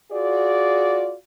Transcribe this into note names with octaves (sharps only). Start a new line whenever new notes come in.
F4 F#4 G#4 D5